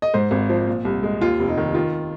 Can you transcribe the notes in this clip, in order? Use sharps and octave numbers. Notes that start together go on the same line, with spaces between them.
D#5
G#2 C5
G#1
F3
A#2
C2
G#3
D#2 F4
F1
D#4
D#3
D#3 F4